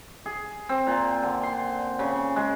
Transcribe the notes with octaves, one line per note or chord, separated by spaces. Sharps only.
G#4
C4
A#2
D3
C6
C#3
G#3